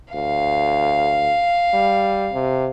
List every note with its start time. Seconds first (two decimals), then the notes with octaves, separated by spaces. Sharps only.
0.14 D2 F5
1.73 G3
2.33 C3